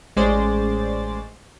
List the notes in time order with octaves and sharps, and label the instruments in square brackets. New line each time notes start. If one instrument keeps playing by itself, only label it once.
[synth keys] A1 G#3 C#4 C5 D5 A6